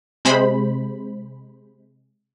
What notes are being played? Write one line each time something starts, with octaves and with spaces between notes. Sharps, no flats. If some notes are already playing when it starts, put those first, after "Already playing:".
C3 G#3 C5 B5